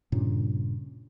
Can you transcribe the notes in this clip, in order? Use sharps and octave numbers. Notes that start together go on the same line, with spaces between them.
G2 A#2 C#3